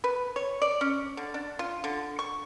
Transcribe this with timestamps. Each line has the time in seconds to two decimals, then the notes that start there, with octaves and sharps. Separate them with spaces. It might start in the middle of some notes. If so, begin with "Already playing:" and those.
0.04 B4
0.36 C#5
0.62 D5
0.81 C#4
1.17 D3
1.34 D4
1.59 F4
1.84 D3
2.19 C#6